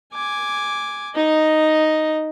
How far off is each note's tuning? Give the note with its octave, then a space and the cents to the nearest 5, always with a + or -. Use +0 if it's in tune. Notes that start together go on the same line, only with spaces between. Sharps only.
G#5 +0 D6 +0
D#4 +0 D#5 +0